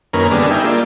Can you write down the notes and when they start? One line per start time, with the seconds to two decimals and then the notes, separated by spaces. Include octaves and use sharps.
0.13 F#2 D#3 A#3 C#4 A#4 B4
0.31 D3 G3 B3 D4 G#4
0.51 D#4 G#4 E5 G5
0.64 A#3 F4 D5